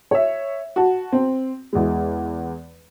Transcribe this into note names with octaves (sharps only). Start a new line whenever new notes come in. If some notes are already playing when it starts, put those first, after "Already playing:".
C#5 E5
F#4 A5
C4
E2 G#3